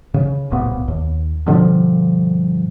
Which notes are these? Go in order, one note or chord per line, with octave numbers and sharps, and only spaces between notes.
C#3
D1 C2 A#2 B3
D#2
G2 B2 D3 F3